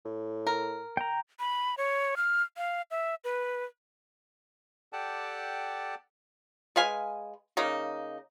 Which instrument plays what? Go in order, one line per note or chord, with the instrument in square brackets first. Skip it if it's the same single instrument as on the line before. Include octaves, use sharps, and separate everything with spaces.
[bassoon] A2
[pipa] A#4
[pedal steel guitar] G5 A#5
[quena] B5
C#5
F6
F5
E5
B4
[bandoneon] G4 A4 D5 F#5 G5 A5
[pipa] G#3 B4 F5 G#5
C#3 A#3 D#4